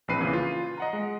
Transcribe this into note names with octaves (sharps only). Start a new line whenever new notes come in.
A#1 E3 C4 B4 C7 D#7
A#2 C#3 E3
F4
D#5 F#5 A#5
G#3